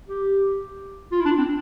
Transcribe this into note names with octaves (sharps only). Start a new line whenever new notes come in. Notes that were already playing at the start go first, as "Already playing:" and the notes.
G4
F4
E4
D4
C4